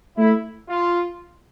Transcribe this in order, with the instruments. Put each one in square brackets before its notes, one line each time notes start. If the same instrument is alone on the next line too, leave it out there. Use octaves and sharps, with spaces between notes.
[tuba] A3 [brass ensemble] E4
[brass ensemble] F4